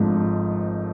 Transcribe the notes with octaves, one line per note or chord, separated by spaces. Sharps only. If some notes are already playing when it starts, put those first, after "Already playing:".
Already playing: G#1 G#2 F3 A3 D4